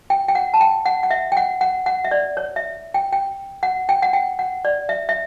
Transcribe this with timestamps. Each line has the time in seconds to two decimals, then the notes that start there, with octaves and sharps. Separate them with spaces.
0.10 G5
0.28 G5
0.35 F#5
0.54 A5
0.61 G5
0.86 F#5
1.03 F#5
1.11 E5
1.32 G5
1.37 F#5
1.61 F#5
1.86 F#5
2.05 E5
2.11 D5
2.37 C#5
2.56 E5
2.94 G5
3.12 G5
3.63 F#5
3.89 G5
4.02 F#5
4.13 G5
4.39 F#5
4.65 D5
4.89 E5
5.09 E5